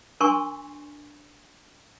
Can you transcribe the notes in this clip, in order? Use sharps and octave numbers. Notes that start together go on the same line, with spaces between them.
D4 A#4 G#5 C6 C#6